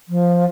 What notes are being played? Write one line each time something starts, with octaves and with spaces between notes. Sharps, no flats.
F3